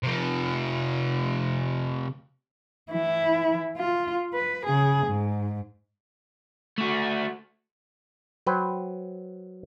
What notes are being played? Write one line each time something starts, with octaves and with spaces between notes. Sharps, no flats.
C3 F3
E3 E4
F4
B4
C#3 G#4
G#2
A3 F#4
F#3 B4 C5 G5